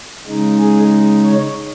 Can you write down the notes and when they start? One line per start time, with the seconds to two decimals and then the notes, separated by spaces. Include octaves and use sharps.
0.26 C#3 G#3 D#4
0.59 G#4
1.25 C#5